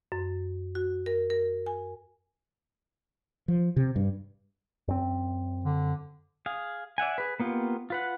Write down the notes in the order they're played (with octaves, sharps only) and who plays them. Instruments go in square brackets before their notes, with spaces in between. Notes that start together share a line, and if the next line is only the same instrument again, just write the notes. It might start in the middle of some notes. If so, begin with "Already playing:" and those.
[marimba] F#2
F#4
A#4
A#4
G#5
[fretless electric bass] F3
C3
G2
[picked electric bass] F#2 C4
[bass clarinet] D3
[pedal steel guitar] G#4 F5
D5 E5 F#5 G#5
G#4 B4
A#3 B3 F4 G4
F4 B4 F#5